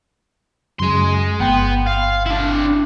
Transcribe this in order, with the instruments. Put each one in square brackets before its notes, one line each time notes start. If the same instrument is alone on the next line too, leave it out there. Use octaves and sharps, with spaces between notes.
[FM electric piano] F#2 C#3 F#3 [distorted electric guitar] G#4 C6
[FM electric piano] G1 G5 C6 [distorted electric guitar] B3
[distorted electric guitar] F5
D4 E4